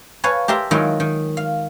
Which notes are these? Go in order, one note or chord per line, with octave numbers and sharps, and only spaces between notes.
B4 C#5 F5 G#5 A5
G4 A#4 E5 A5 C6
D#3 F#3 G#3 E4 F4 A#4
D#3
F5